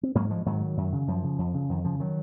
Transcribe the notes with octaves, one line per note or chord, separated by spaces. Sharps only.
C4
G#2 F#3 A#3
F3 G#3
G#2 D#3 F#3
F#2
C#3
F#2 F3
C#3
F2
C#3
F2 D#3
C#3 F3
D#3 F#3